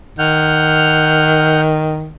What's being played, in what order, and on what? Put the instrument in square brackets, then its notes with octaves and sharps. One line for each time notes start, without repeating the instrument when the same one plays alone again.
[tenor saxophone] D#3 [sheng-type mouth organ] F#5 F6 G6